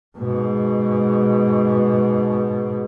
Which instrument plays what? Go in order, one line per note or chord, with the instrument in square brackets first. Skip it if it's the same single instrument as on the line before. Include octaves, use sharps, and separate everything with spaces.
[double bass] G#2 B2